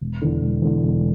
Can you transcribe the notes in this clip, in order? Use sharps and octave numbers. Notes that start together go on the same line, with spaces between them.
E1
E2 D3
E1
E2 D3
E1